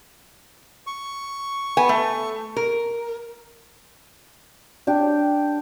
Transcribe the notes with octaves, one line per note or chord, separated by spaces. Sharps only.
C#6
B3 G#5
A3
A#4
D4 G4